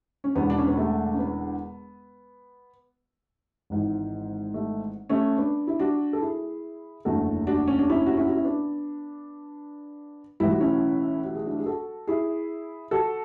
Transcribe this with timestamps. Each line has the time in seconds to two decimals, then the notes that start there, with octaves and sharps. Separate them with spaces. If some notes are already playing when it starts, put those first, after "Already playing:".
0.24 C#4
0.35 E1 E2 D3 B3
0.50 D4
0.58 C#4
0.68 B3
0.77 A3
1.13 C#4
1.19 B3
3.70 G#1 G#2 E3
4.54 A3
5.09 A3 C#4
5.37 B3 D4
5.67 E4
5.79 D4 F#4
6.13 A4
6.21 E4 G#4
7.05 F#1 E2 D3 A3 F#4 A4
7.47 D4 F#4
7.68 C#4
7.79 D4
7.90 C#4 E4
8.06 F#4
8.17 C#4 E4
8.28 F#4
8.36 E4
8.44 B3 D4
10.40 B1 A2 E3 E4
10.50 F#4
10.61 C#4 E4
11.24 F#4
11.35 G#4
11.46 D4 F#4
11.60 G#4
11.66 F#4 A4
12.07 E4 G#4
12.91 F#4 A4